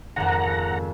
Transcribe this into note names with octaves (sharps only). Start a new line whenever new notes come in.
G#1 F2 F#5 A#5